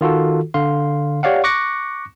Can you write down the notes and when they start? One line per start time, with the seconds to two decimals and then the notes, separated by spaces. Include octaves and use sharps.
0.01 D#3 F4 F#4 A4
0.54 D3 F5 C6
1.23 G4 C#5 D5 F5 F#5
1.44 C#6 D6 F#6 A#6 C#7